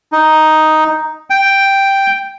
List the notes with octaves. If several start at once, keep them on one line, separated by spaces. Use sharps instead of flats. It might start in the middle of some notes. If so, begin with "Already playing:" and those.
D#4
G5